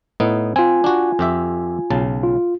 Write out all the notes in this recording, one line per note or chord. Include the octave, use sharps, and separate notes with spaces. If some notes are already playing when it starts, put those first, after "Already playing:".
A2 B3 D#4
C4 F4 G#5
D4 F#4
F2 G4 E5
B1 C#3 A5
F4